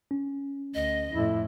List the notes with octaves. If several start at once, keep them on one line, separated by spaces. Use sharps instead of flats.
C#4
D2 D#5
F2 A2 E4